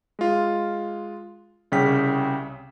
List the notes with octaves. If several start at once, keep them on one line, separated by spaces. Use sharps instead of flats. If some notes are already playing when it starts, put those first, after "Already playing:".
G#3 F4
C2 C#3 C#4 G5 B6